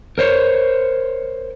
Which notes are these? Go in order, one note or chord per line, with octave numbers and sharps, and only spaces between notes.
A#4 C5 C#5